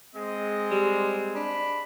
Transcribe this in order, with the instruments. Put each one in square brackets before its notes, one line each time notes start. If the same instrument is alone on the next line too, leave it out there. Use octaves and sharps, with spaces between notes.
[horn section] G#3 C4 [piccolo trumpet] D#5
[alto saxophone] G3
[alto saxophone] D4 [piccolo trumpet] B5